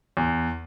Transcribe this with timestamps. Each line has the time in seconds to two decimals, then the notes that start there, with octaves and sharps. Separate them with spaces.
0.17 E2